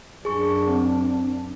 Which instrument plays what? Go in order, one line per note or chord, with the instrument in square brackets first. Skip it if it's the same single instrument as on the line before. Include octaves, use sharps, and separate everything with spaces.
[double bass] F#2 D4 [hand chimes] G#4 C#6
[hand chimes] C4